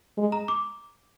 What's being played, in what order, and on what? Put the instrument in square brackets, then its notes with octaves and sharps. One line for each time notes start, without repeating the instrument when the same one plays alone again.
[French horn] G#3
[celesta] A#5
D6